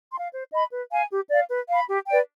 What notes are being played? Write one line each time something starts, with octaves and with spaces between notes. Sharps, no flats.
C6
F5
C5
D#5 B5
B4
F5 G#5
G4
D5 F5
B4
F5 B5
G4
B4 D5 G5